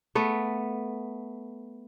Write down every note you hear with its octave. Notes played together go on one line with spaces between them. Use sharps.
A3 B3